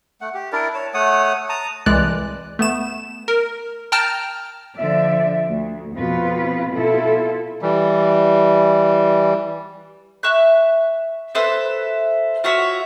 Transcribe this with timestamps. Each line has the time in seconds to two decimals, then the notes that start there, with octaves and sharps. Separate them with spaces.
0.21 A3 F#5
0.34 G4
0.53 D4 E4 A#4 D5
0.74 C#5 A5
0.94 A3 C#5 F#5 D#6
1.49 A5 A#5 D#6
1.86 C2 E3 G#3 D5 F#6
2.59 A3 B3 E7
3.28 A#4
3.92 G5 A5 A#5 F6
4.78 D3 F3 D5 E5
5.49 D2
5.95 F2 B2 C4 F4 B4
6.73 B2 E4 F4 A4
7.62 E3 G3
10.23 E5 C#6 F#6
11.35 A4 B4 C5 E5
12.44 F4 F#4 C#5 E5